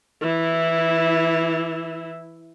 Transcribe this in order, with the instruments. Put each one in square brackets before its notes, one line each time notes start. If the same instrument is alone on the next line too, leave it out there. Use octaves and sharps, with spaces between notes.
[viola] E3 E4